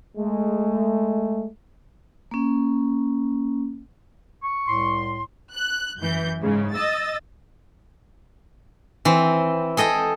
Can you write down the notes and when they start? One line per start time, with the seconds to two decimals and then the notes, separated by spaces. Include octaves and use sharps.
0.17 G#3 A3
2.31 A#3 C#4
4.43 C#6
4.67 C2 A2 C6
5.54 F#6
5.99 F#2 E3 G6
6.41 G#2 C#3
6.73 D#5 E6 A6
9.05 E3 C4
9.77 G#4 A4 D#5 G5